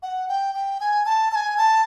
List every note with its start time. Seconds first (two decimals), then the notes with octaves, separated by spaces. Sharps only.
0.03 F#5
0.29 G5
0.55 G5
0.80 G#5
1.06 A5
1.31 A5
1.36 G#5
1.58 A5